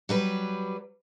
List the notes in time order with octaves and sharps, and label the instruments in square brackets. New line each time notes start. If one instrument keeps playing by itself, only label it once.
[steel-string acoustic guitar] F#3 G3 B4